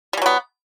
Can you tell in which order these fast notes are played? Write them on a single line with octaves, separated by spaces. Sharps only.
G3 E3 F#3 B3